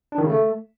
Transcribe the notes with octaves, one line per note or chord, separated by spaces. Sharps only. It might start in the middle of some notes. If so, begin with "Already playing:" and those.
D4
D#3
C#3
A3